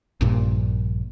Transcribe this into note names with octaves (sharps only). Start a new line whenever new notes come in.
A#1 G2 A#2